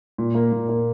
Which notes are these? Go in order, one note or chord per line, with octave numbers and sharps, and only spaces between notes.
A#2
A#3
A#2
A#3